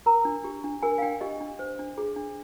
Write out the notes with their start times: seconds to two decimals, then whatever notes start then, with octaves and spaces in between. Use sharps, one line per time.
0.06 A#4 A#5
0.25 D4
0.44 G4
0.64 D4
0.83 A#4 G#5
0.98 F5
1.02 D4 G5
1.21 G4 D#5
1.40 D4
1.59 C5
1.79 D4
1.98 G#4
2.16 D4